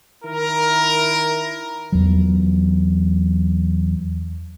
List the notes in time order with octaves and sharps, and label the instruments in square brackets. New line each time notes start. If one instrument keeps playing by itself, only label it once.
[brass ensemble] D#3 E4 A#4
[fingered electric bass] E2 F#3